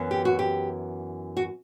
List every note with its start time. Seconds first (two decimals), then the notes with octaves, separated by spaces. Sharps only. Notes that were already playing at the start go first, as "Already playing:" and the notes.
Already playing: F#2 E3 B3
0.11 G4
0.25 F#4
0.39 G4
1.37 F#4